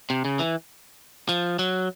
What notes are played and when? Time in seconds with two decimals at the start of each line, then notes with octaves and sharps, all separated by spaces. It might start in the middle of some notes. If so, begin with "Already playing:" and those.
0.10 C3
0.25 C#3
0.39 E3
1.29 F3
1.59 F#3